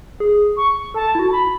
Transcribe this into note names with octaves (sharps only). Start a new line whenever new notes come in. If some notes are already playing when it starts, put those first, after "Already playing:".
G#4
C#6
A4 A5
E4
F#4
A5
B5